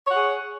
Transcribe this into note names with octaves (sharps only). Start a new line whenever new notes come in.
G#4 C#5 F#5